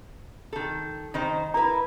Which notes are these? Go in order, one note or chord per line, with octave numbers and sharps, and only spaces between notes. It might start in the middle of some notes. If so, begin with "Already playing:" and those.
D#3 A4
D#3 D#4 C5
E4 A#4 B4 A#5